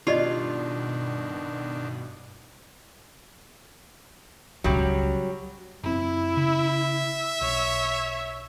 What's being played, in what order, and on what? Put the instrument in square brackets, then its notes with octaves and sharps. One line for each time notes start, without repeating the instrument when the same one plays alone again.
[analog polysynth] G2 B2 [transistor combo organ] D#3 D4 [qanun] F4 [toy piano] G4 D5 D#5
[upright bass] C#2 C#3 [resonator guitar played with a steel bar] F#3 G3
[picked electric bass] F#1 C4 [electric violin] E4
[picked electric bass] C#3 [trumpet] E5
[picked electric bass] B1 [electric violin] C#5